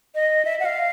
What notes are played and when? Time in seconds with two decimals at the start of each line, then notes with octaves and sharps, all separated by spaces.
0.15 D#5
0.45 E5
0.60 F#5
0.65 F5